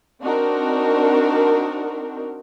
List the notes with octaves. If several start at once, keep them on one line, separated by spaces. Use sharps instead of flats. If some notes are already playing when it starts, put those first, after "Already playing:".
C4 D4 D#4 F#4 A#4